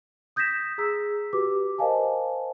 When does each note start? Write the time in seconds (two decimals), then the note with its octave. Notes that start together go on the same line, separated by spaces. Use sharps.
0.36 D#6 G6 G#6 A#6 B6 E7
0.78 G#4 A#5 E6 B6
1.33 F#4 G4 B4 D6
1.78 A#4 C5 D#5 F5 G#5 A5